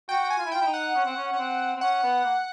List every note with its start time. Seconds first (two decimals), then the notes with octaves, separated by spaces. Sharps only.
0.09 F#4 G5
0.30 G#5
0.38 F4
0.46 E4
0.52 F4 G5
0.61 E4
0.67 D#4
0.74 F#5
0.95 C#4
1.06 C4
1.17 C#4
1.33 C#4
1.38 C4
1.76 C4
1.81 C#4 F#5
2.03 B3
2.25 A#3